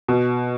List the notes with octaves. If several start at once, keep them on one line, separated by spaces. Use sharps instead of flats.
B2